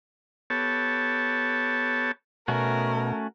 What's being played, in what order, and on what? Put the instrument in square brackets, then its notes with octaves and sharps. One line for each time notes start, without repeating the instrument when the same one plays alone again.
[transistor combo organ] B3 G4 A4 C#5 A5
[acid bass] B2 [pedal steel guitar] A3 C#4 F#4 [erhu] A#4